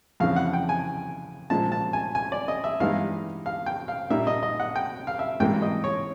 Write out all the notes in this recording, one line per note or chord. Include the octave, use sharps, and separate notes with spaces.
F2 C#3 E3 F5
F#5
G5
G#5
A#2 F3 G#3 A5
A5
G#5
G#5
D5
D#5
E5
G2 E3 G#3 B3 D#4 F5
F5
G5
F5
A#2 G3 A#3 D#4 E5
D#5
D#5
F#5
G5
F5
E5
G#1 G#2 E3 G3 A#3 G5
D#5
C#5